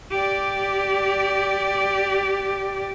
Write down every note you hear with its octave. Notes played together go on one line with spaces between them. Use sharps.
G4 D5